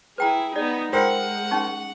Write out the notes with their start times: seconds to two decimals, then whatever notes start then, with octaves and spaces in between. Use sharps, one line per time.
0.18 E4 G#4 B4 G5 A#5
0.56 B3 D#4 D5
0.93 G#3 F4 A#4 C5 F#5 G5 E6
1.51 C#4 D#4 C#6